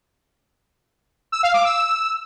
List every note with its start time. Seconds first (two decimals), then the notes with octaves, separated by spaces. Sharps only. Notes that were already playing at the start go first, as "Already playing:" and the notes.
1.32 E6
1.43 F5
1.54 D6
1.65 E6